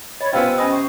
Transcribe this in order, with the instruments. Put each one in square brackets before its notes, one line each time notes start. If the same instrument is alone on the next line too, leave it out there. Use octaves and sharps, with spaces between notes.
[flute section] C#5 B5 [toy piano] D#5
[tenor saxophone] C3 [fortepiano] B3 F4 [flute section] G#5 E6
[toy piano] C#4 B5 D#6 [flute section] D#5 G#5
[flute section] C5 C#6